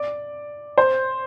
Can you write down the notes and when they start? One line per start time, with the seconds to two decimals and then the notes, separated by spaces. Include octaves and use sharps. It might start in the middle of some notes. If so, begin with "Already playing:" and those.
Already playing: D5
0.78 C5